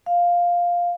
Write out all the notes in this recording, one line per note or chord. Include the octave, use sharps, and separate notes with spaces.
F5